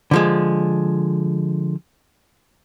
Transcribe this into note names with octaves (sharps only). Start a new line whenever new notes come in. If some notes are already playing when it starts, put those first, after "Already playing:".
D3 F3 G#3